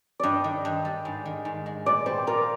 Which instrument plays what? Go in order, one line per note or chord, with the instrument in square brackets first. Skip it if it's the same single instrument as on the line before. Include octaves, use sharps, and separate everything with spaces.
[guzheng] G2 [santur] D5 D#5
[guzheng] D#3
G2
G3
G#2
D#3
G#2
G#3
[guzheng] A#2 [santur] D5
[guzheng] G3 [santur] C5
[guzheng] F4 [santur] A#4